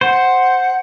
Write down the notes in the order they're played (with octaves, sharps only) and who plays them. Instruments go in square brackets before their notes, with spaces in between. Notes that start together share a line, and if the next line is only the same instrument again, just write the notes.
[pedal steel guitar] C5 [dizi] F#5